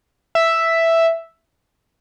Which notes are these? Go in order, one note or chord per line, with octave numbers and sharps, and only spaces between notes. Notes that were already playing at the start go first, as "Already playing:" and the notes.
E5